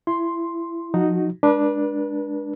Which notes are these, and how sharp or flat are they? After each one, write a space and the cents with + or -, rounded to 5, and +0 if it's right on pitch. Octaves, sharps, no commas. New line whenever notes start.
E4 +25 C6 +0
F3 +25 D#4 +0 F#4 +0
G#3 +0 D4 +0 B4 -40